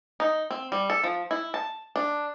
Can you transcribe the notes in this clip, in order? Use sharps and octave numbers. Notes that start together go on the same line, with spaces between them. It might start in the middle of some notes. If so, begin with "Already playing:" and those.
D#4
C4
G3
A4
F3
E4
A5
D4